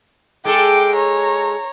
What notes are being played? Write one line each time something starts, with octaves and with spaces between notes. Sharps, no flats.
G#3 G#4 A4 G5 D6
C#5 A#5